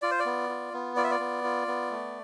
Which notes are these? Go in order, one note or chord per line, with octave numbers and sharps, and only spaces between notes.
F4 D5
C5
D5
B3
F4
B3
F4 D5
E5
D5
B3
F4
B3
A3